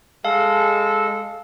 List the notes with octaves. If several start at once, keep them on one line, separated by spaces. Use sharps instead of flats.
G#3 A4 F5